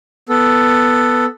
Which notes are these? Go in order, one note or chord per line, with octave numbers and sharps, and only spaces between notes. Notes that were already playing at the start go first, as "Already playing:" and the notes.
B3 A4